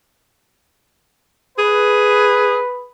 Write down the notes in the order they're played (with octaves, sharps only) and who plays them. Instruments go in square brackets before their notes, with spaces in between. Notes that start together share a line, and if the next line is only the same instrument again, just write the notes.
[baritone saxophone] G#4 [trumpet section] B4